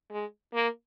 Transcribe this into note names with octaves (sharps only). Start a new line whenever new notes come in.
G#3
A#3